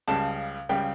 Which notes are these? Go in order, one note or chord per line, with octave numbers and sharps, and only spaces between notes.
C#2 C#3 G3 A5
C#2 C#3 G3 G5